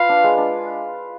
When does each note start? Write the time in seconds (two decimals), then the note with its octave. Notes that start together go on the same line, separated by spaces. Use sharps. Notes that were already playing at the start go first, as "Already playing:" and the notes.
Already playing: F4 B4 F5
0.09 D4
0.24 G#3
0.38 D4